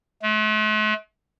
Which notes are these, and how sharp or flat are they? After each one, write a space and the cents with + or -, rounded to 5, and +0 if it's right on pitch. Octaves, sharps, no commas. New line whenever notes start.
A3 -45